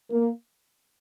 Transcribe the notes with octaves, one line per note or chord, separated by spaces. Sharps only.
A#3